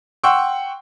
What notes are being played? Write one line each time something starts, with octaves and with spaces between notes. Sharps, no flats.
F#5 G5 C6 C#6 E6